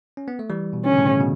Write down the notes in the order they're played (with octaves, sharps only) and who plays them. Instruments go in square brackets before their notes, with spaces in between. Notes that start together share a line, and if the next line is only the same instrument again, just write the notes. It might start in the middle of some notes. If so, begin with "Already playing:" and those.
[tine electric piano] C#4
B3
A3
E3 G3
B2
[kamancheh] C#4
[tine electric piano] D3
A2 C#3
C#3
B2